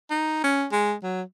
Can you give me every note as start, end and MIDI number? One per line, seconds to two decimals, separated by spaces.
0.10 0.39 63
0.43 0.65 61
0.72 0.94 56
1.03 1.22 54